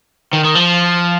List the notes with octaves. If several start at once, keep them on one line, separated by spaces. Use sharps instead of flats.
D#3
D#3
F3